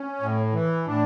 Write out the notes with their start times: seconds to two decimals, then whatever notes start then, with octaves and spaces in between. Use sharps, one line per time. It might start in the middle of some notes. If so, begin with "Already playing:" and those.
Already playing: C#4
0.21 A2
0.53 E3
0.86 A2 D4